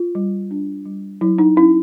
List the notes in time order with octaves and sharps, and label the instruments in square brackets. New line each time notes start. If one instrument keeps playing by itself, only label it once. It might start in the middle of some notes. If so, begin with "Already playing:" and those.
Already playing: [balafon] F4
G3
D4
G3
F#3 E4
D#4
C#4 E4